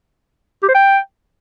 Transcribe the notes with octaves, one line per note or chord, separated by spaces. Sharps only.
G4
C5
G5